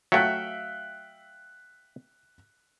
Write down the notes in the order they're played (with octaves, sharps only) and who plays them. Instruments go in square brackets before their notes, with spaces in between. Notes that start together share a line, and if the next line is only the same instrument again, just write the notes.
[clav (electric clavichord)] F#3 A3 [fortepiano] E5 F5 G5 [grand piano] F#6 B6 C#7